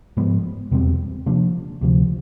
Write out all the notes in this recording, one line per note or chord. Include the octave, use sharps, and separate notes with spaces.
G#2 F3 G#3 B3
E2 B2 G3 C4
C3 F3 A#3 D4
D2 C3 F3